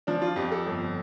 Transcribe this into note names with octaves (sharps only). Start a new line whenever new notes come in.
F3 D4
F4
F2 G4
A4
G1